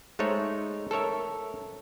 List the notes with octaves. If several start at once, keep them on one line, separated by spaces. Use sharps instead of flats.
G#3 A3 D#4 C5 C#5
A4 A#4 C#5 E5